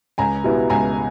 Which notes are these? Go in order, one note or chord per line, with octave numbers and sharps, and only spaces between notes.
C#2 G#5 A#5
B2 G3 B3 E4
C#2 G#5 A#5